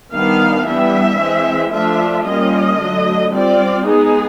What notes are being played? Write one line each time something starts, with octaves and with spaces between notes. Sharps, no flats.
D#3 G3 B3 D4 F5
E3 G3 B3 D4 E5
E3 G#3 C4
F3 A3 D4 F4 E5
G3 A#3 C#4 F4 D#5
D3 F#3 A3
G3 C4 F4 D5
G#3 B3 D#4 G#4